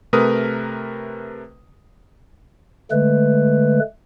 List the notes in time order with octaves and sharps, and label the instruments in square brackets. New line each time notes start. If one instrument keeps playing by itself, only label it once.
[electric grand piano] C3 A3 A#4 B4 D#6
[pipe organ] D3 G#3 A3 B4